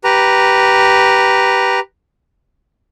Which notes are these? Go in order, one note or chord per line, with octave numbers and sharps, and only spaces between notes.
G4 B4 A#5